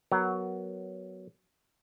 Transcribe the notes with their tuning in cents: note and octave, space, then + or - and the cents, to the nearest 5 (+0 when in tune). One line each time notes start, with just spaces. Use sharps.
F#3 +10 B3 +0 A#4 +0